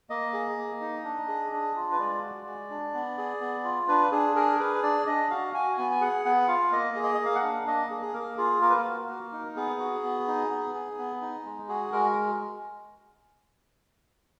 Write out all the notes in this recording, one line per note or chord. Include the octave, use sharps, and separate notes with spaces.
A#3 D#5
G#4
A#3
D#4
D4
G#4
D4
F4
B4
G#3 D5
F#4
G#3
D4
B3
G#4
B3
F4
D4 B4
D4 G#4
G#4 A#4
G#4 B4
D4 D5
D4 D#5
F#4 F5
F#4 G#5
B3 G#5
G#5
G#4 F#5
B3 F#5
F4 F5
A#3 D#5
G#4
D#5
D#5
A#3
F5
F#5
D4
A#3 D#5
G#4
G#4
A#3 A#4
F4 G#4
A#3 A#4
B4
A#4
F#4
A#3
D#4
B3 G#4
F#4
B3
D#4
B3
G#4
B3
D#4
G#3
F#4 G#4
G#3 A#4